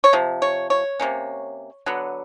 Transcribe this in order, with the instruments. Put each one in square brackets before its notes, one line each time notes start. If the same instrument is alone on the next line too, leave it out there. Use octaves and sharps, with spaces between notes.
[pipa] C#5
C3 F3
C#5
C#5
C3 F3 A#3 C#4
D3 F#3 B3